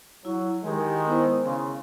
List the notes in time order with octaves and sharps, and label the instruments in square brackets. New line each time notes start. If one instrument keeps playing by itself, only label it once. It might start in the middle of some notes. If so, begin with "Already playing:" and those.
[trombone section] F#3 [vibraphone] E4
[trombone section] D#3 G#3 [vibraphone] G4 G#4
[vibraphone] B3 E4 C5
[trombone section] C#3 [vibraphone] C6